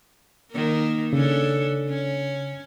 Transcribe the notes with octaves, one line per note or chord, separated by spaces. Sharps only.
D#3 A#3
C#3 C#4 D4 A4
C#4